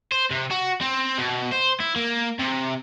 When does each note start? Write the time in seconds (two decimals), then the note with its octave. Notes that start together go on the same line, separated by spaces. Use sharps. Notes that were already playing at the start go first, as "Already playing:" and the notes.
0.12 C5
0.31 C3
0.51 F#4
0.81 C4
1.18 B2
1.52 C5
1.80 E4
1.96 A#3
2.39 C3